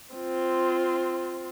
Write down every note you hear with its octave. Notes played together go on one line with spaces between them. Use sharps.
C4 F4